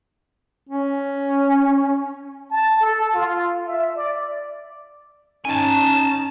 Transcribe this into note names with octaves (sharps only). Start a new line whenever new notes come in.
C#4
A5
A4
F4
E5
D5
C#4 D#4 G#5 A5